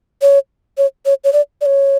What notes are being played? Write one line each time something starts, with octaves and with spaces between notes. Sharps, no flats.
C#5
C#5
C#5
C#5
D5
D5
C#5